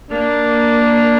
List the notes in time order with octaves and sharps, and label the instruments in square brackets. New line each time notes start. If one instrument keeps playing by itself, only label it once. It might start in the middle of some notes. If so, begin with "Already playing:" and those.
[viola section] A#3 [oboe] D4